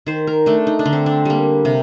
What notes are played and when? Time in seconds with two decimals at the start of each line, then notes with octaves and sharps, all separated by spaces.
0.07 D#3 C5
0.27 A#4
0.46 A3 D4
0.67 D#4
0.79 D4
0.85 D3
0.93 C4
1.06 D4
1.25 G3 A#3
1.65 C3